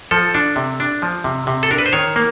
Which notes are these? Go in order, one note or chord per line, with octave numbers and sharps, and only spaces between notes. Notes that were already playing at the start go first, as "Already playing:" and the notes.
F3 A4
D4
C3
D4
F3
C3
C3
A4
D4 A#4
B4
C5
D#3 C#5
A#3